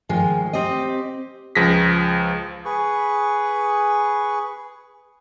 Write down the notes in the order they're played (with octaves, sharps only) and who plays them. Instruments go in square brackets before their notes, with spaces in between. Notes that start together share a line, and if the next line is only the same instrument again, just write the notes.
[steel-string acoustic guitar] D#3 F3 G#3
C4 G4 D#5
[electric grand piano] C#2 F3 G#4 A#6 B6
[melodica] G#4 B4 C#6